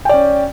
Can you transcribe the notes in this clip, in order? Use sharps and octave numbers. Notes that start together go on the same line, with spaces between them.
C#4 D5 G5